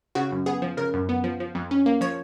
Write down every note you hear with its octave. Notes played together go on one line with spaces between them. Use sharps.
C#3 F#4
F#2
B3 G#4
F3
C#3 A#4
F#2
B3
F3
F3
F2
C#4
A#3
F3 C#5